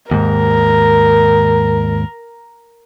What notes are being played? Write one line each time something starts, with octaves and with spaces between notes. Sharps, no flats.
D#2 G#2 A#4